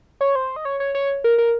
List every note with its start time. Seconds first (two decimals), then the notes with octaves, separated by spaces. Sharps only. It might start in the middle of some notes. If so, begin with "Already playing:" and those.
0.21 C#5
0.35 C5
0.56 D#5
0.65 C#5
0.80 C#5
0.95 C#5
1.24 A#4
1.38 A#4